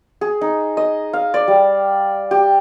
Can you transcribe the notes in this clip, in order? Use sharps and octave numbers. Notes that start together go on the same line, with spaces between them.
G#4
D#4
D#5
F5
D5
G3
G4